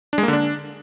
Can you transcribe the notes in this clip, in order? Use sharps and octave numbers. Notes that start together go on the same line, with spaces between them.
D4
G#3
A#3
D3
D4